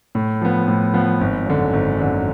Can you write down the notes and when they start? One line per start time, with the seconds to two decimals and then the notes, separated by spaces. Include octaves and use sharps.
0.15 A2
0.42 F3 B3
0.68 A2
0.94 F3 B3
1.21 G#1
1.46 F#2 D3
1.73 G#1
1.99 F#2 D3